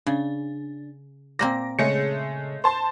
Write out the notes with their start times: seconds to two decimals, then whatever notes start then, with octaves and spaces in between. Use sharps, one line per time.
0.07 C#3 D4
1.39 A#2 A#3 C4 D6 A#6
1.79 C#3 G#3 A3 G#4 C#5 C#7
2.64 C5 A5 C6